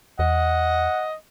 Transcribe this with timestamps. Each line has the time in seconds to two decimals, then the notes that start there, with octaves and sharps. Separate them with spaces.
0.19 E2 D#5 F#5